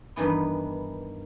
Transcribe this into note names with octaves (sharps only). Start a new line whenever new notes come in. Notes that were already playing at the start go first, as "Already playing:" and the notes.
G2 D#3 E3 B3